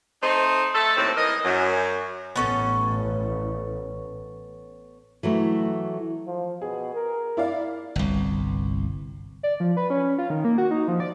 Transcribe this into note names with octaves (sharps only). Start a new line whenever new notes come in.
A3 C4 D#4
A3 A4
D#2 A2 C4
E3 A#4 D#5
F#2
A1 B3 C#4 A4
E3 F#3 A3
F3
B2 G#4
A#4
E4 D5 F5
G1 C2
D5
F3
B4
C#4
C#4
F4
D#3
A#3
F#4
D#4
F3
D5